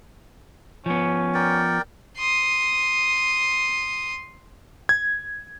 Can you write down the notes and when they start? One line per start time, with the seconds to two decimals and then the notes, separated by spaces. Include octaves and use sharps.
0.86 F3 B3 C#4
1.34 A#4 D5 G5
2.17 C6 D#6
4.89 G#6